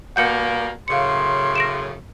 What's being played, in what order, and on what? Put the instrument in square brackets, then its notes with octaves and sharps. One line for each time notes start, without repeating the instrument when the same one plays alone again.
[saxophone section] B2 G3 A#3 [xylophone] F#5 G6 C#7
[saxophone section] F#2 A2 C#3 [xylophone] F5 C#7 [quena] C6
[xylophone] A#6 D7 E7